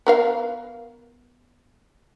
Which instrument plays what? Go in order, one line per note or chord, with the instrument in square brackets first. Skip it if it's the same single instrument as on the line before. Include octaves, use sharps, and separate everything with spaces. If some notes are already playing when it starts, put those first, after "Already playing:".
[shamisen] B3 A#4 F5